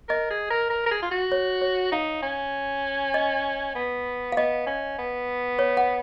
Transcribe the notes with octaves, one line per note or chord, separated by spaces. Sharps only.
A#4 D#5
G#4
A#4
A#4
A#4
G#4
F4
F#4
C#5
C#5
D#4 F5
C#4
D#5
B3
F5
B3 D#5
C#4
B3
C#5
F#5